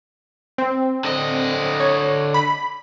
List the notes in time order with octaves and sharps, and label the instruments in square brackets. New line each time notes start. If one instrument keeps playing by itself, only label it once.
[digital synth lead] C4
[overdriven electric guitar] D3 D#5
[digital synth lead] C#5
B5